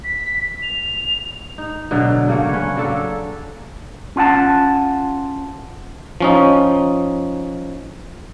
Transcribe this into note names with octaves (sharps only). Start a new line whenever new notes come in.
B6
F7
D#4
B2 D3 F#3
C#3 A#3 D4 C#5
C#4 B4 C#5
F#3 A#3 D4 A4
C#4 F4 F#5 A5
F3 C#4 D#4